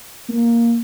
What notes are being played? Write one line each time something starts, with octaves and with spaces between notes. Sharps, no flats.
A#3